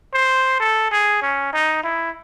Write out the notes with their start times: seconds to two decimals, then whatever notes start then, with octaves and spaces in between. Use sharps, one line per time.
0.14 C5
0.60 A4
0.91 G#4
1.22 C#4
1.53 D#4
1.83 E4